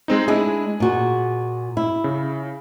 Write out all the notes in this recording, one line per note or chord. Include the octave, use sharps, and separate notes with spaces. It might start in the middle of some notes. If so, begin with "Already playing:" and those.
G#3 C4 D#4
G#3 D4 E4 G#4
A#2 F#4
E4
C#3